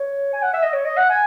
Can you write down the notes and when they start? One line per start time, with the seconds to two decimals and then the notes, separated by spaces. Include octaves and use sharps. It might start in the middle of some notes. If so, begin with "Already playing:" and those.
Already playing: C#5
0.33 G#5
0.43 F#5
0.53 E5
0.63 D#5
0.73 C#5
0.85 D#5
0.97 F#5
1.10 G#5